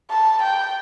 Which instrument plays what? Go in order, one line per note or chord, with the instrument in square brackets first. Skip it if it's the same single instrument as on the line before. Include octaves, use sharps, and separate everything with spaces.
[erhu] A5
G5